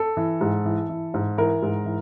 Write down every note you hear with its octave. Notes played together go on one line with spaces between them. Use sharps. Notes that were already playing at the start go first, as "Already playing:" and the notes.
Already playing: A4
E3
G#2
E3
E3
G#2
E3 A#4
G#2
E3